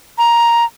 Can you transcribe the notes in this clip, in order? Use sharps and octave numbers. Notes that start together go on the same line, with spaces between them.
A#5